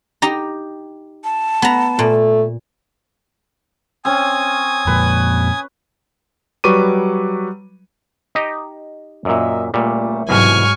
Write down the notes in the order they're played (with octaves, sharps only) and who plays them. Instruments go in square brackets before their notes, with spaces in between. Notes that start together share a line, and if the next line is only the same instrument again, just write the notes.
[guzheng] D#4 G4 A#5
[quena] A5
[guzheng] B3 A#5
[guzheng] A#2 [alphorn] A3
[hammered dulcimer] C4 C#4 [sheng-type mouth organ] G#5 D#6
[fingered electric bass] F2 A#2 [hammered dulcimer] B4
[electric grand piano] F#3 G3 B4 C#6 D6 D#7
[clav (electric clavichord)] D#4 G4 D#5
[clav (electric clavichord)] F#2 A#2 [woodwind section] D#5 E5
[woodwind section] C#2 A3 [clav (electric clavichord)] A#2 G3
[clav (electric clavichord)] C2 B2 E3 [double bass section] G#2 F#3 [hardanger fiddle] G#5 C#6 [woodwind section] F6